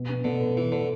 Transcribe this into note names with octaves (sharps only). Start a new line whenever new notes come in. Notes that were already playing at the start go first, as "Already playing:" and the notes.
Already playing: B2
B3
B2 D3
B4
E3 E4
D3 B4